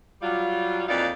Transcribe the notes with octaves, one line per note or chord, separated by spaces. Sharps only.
F#3 G3 F4
F2 E3 A#3 D#4 F4 D5